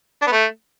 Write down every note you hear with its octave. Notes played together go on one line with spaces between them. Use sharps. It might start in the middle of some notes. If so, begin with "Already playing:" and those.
D4
B3
A3